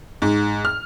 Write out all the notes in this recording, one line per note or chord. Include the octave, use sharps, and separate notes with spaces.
G#2
F6